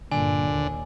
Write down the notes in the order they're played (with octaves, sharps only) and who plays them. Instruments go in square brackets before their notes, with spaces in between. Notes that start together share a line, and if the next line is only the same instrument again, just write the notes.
[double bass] G2 A#2 [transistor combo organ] D3 [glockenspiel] G#5
[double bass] D#2